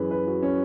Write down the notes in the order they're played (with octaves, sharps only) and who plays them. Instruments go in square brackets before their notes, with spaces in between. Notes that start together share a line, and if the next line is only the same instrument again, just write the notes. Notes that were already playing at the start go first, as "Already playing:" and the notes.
Already playing: [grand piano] F#2 E3 G#4 B4
B4
F#4
C#4